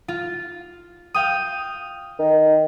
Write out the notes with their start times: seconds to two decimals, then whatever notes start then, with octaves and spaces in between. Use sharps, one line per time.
0.08 F4
1.14 F5 G5 D#6
2.19 D#3